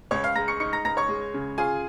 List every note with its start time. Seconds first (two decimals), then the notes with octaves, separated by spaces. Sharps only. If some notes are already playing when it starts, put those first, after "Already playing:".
0.11 C#2 C#5 C#6
0.24 F5 F6
0.35 G#3 A#5 A#6
0.48 C#6 C#7
0.60 D#4 C#6 C#7
0.73 A#5 A#6
0.85 C#2 A#5 A#6
0.97 C#5 C#6
1.09 G#3
1.34 C#3
1.58 F4 G#4 G#5